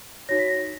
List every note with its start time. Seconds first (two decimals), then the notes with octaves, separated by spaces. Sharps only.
0.29 D#4 F#4 C#5 A#6
0.39 B6
0.48 A#6